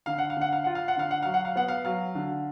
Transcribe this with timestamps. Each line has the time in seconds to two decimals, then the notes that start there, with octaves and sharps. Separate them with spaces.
0.06 D3 F5
0.18 F#5
0.30 F5
0.37 D3 F#5
0.53 F5
0.64 F4 F#5
0.75 F5
0.88 F#5
0.96 D3 F5
1.11 F#5
1.23 F#3 F5
1.34 F#5
1.45 F5
1.56 B3 F#5
1.68 F5
1.85 F#3 F5
2.15 D3